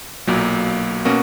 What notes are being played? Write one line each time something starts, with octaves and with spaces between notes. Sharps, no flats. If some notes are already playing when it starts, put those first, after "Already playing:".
B1 A#2 F#3 A#3
B2 A#3 C#4 F#4